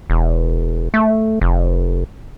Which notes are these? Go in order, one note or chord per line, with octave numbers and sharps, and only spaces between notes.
E1
A3
F1